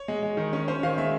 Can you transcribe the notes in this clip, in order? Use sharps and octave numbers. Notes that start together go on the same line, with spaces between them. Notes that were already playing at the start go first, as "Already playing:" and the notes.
Already playing: C#5
G#3
G#3
D#3
C#4
C#4 C5
D#3 F5
G#3 E5